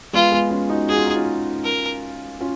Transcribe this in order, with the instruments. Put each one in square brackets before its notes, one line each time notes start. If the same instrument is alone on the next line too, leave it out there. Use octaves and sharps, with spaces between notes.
[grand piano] G#3 B3 [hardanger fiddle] F4
[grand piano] G#3 B3
C#4 F4
D#4 F#4
[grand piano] F#4 [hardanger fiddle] G#4
[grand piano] F4
D#4
C#4 F4
[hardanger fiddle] A#4
[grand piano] C#4 F4